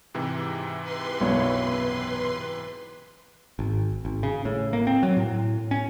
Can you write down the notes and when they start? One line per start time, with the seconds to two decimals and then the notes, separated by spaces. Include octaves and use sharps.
0.14 G#2 C3 E3
0.81 B4 C6
1.21 B1 F#2 C#5
3.59 G#1
4.05 G#1
4.23 C#3
4.45 A2
4.73 A#3
4.87 C4
5.03 F#3
5.17 A2
5.71 C#4